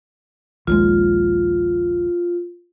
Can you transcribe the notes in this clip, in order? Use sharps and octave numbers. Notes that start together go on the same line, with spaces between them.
A#1 D#2 G#3 F4